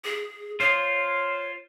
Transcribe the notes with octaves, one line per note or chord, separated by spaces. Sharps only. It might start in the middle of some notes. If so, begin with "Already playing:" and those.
G#4
F4 C5 C#5